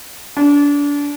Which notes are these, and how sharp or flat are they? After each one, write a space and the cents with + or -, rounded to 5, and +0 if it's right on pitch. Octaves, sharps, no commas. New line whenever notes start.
D4 -30